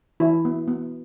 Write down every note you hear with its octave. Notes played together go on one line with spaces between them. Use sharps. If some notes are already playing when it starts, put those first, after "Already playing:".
E3 E4
B3
B3